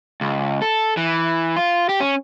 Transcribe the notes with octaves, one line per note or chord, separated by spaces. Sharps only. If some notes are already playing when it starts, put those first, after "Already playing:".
C#2
A4
E3
F4
G4
C#4